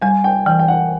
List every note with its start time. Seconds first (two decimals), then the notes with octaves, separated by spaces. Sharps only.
0.02 G3 G#5
0.24 G5
0.46 E3 G5
0.59 G5
0.68 F#5